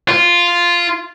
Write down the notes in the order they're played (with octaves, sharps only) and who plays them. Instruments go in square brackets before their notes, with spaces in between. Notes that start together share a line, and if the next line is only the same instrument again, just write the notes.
[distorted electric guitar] F4